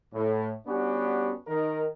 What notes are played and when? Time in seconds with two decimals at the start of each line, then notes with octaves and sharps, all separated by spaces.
0.13 A2
0.65 G2 B3 C#4 D4 F#4 G4
1.47 D#3 A#4